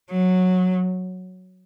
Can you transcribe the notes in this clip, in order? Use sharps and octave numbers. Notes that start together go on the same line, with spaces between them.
F#3